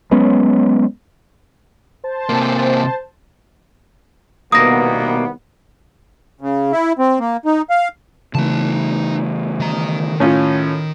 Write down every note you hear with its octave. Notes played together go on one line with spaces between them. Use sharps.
F#3 G#3 B3 C#4
C5 A5
C3 A#3
C2 B2 D#3 A#3 B3 D#6 A#6
C#3
E4
C4
A#3
D#4
F5
C#3 E3 A3 D#4 A5
D#3 A#5
A2 D#3 C#4 F4